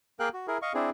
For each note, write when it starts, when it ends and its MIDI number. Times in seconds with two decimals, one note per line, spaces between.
0.20 0.29 58
0.20 0.29 68
0.20 0.29 70
0.20 0.29 77
0.20 0.29 79
0.20 0.29 90
0.34 0.47 66
0.47 0.58 64
0.47 0.58 68
0.47 0.58 70
0.62 0.73 75
0.62 0.73 77
0.62 0.73 85
0.74 0.90 60
0.74 0.90 62
0.74 0.90 64
0.74 0.90 68